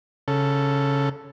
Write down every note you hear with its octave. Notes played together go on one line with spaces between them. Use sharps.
C#3 A4